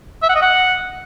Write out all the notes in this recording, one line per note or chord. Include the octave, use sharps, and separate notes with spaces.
E5
F#5
D#5
F#5